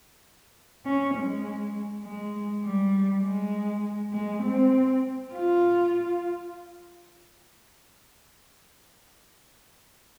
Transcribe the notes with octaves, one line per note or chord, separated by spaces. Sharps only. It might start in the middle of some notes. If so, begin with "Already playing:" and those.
C#4
G#3
G#3
G3
G#3
G#3
C4
F4